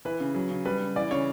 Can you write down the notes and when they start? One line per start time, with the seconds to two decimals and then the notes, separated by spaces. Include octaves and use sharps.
0.05 E3 B4
0.20 C#3
0.35 F#3
0.50 C#3
0.65 G3 B4
0.81 C#3
0.96 E3 D5
1.11 C#3 C#5